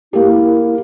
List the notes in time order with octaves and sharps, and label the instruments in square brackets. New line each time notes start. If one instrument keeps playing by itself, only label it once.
[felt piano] A#3 G4 [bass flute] E4